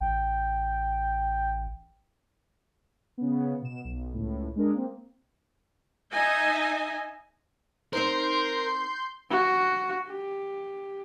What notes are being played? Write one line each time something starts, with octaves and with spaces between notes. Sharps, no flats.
A1 G5
C#3 B3
B2 E7
B1
C#2 A2
G#3 D4 A#4 D#5
A#3 C4
D#4 D#5 E5 G#5
C4 D#4 A#4 C5 C6 G6
F#4
G4